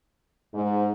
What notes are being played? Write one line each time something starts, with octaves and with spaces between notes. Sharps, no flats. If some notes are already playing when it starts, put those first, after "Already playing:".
G#2